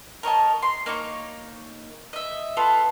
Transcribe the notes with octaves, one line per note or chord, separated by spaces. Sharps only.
A#4 C#5 D#5 A5
C6
A#3 D#4 C#5 C#6
D#5 E5
B3 F4 A4